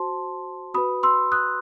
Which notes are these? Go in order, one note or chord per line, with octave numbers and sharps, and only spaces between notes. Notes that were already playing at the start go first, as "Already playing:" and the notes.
Already playing: F#4 C5 A5 C6
F#4 B4 B5 D#6
C6 E6
D#6 F#6